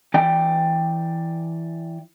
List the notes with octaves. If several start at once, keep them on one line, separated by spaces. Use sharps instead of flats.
E3 D5 G5